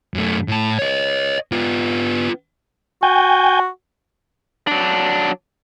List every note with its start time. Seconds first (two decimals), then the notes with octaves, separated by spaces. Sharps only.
0.14 F#2 A3
0.48 A2 A5
0.78 C#5 D#5
1.52 B3 F4
3.03 F#4 G5 G#5
4.67 F#3 D4